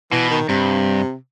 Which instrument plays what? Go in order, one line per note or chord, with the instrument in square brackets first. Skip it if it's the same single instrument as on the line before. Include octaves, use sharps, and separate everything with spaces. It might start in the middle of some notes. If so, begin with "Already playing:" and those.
[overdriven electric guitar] B2 [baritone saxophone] E3
[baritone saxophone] D#3
[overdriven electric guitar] G2 [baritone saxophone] C3